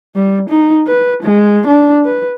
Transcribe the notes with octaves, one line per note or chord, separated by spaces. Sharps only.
G3
D#4
B4
G#3
D4
B4